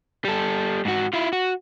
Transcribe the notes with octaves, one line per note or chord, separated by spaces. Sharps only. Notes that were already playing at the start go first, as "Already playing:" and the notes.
G3 A4
G#2 F#4
E4 F4
F#4